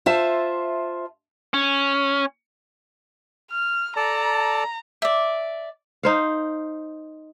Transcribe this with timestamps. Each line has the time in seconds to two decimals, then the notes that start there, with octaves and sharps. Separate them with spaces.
0.06 F4 C5 E5 A5
1.54 C#4
3.51 F6
3.97 A4 D5 A5 A#5
5.02 D5 E5
6.03 D#4 C5 F5